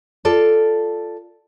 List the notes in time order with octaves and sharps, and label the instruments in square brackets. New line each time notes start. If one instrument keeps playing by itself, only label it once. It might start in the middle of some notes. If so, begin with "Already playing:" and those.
[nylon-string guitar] F4 A4 D5